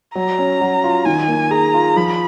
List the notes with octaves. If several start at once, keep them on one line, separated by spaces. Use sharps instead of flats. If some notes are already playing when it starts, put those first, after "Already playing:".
F#3 A#5
C#4
F#3
F4
D#3 G#5
A#3
G#4 A#5
F4
F3 B5